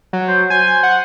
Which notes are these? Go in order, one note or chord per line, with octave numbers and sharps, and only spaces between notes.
F#3
C5
C5 G#5
F#5